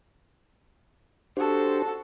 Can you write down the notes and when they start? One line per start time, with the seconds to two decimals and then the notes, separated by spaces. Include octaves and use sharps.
1.37 D4 F#4 G4 A4 C5